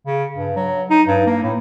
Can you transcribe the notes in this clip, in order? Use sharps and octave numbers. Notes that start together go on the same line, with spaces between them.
C#3
G2
F#3
D#4
G2
A#3
A2